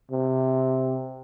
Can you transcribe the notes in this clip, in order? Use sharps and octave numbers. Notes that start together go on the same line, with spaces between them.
C3